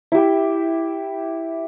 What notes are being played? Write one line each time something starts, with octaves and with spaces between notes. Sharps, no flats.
E4 G4